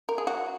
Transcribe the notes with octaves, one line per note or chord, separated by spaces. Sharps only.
A#4
G#4
F#4